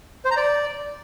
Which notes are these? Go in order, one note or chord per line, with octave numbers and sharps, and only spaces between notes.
C5
A#5
D5